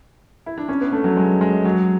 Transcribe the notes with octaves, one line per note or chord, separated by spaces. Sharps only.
E4
D4
C#4
B3
A3
F#3
G#3
G#3
F#3